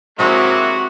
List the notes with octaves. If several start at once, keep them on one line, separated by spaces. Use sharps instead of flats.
C3 F#3 G#3 A#3 C4 E4 F#4